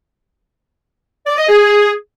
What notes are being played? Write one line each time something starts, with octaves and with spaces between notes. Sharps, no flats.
D5
D#5
G#4